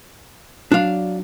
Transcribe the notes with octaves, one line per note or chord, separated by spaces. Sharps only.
F#3 D4 F5